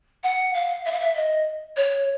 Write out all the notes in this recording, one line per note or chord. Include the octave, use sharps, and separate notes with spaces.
F#5
F5
E5
F5
E5
D#5
C#5